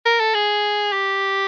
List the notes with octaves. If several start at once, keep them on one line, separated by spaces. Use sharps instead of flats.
A#4
A4
G#4
G4